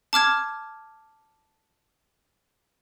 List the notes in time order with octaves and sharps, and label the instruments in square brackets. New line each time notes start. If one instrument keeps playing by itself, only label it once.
[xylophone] A5 D6 F6 G#6